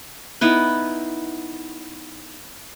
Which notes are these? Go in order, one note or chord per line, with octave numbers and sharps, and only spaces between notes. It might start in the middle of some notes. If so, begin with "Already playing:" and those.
B3 D#4 E4 B4